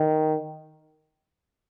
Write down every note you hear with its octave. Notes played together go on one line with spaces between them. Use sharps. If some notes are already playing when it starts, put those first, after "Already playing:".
Already playing: D#3